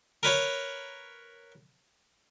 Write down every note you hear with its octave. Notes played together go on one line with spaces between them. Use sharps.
A#4 B4 C#5 B5